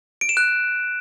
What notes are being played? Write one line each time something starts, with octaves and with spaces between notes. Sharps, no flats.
D7
E7
F#6